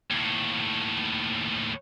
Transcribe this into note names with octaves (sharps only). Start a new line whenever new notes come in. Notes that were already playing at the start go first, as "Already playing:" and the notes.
D#2 A2